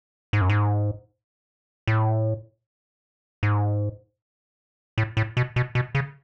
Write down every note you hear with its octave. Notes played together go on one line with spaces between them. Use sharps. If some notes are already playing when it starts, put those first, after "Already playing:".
G#2
F#2
G#2
A2
G#2
A2
A2
B2
B2
B2
C#3